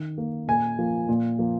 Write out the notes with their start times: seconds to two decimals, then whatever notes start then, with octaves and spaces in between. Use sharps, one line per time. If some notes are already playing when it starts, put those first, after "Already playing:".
Already playing: D#3
0.18 A#3
0.47 A#2 G#5
0.79 F3 A#3
1.09 A#2
1.39 F3 A#3